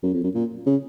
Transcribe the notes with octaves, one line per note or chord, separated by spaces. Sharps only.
F#2
F2
F#2
A#2
C#3